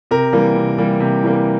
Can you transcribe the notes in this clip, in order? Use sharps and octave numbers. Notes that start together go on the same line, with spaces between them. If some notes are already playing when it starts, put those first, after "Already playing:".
C3 A#4
E3 G3 A#3
C3
E3 G3 A#3
C3
E3 G3 A#3